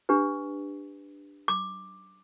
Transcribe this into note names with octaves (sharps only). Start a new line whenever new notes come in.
D4 G4 B4
D6